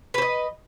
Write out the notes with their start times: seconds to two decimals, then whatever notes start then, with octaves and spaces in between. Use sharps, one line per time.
0.14 B4
0.18 C5
0.22 D#5